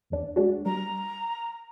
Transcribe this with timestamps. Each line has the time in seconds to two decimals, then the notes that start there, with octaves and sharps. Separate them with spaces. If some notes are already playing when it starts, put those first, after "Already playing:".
0.10 A#1 E2 D4
0.36 G#3 D4 F#4
0.66 G3 A#5